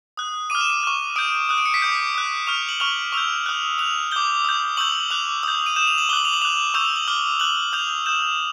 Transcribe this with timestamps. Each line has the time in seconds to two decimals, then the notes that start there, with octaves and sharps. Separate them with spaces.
0.17 D#6 F#6
0.50 D6 F6 D#7
0.61 E7
0.70 D#7
0.83 C#6 F6
1.16 D#6 G6 D7
1.49 D#6 F#6
1.58 D7
1.66 C#7
1.74 B6
1.82 D6 G6
2.15 D#6 F#6
2.47 C#6 F6 F7
2.69 F#7
2.80 C#6 F6 F7
3.12 C#6 E6 G6 F7
3.46 D#6 F#6
3.78 D#6 F#6 F7
4.11 D6 G6 G7
4.45 D#6 G6
4.77 C#6 E6 G6 F#7
5.10 D6 F#6 F7
5.43 D#6 G6
5.66 D#7
5.76 D#6 G6 E7
5.87 F7
5.98 F#7
6.09 D6 G7
6.13 F#6 F#7
6.25 F7
6.33 F#7
6.42 D6 F#6 F7
6.74 C#6 E6 G6 F7
6.85 F7
6.96 F#7
7.08 D6 F6 G7
7.40 D6 F#6 F#7
7.73 D#6 G6 F7
8.06 D#6 G6 E7